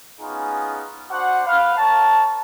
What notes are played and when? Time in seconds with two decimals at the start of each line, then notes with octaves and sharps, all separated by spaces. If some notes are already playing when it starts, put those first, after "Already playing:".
0.21 B3 C#4 D#4 F4 G#4
1.10 D4 F#4 C5 F#5
1.46 B4 F5
1.77 A#4 C#5 A5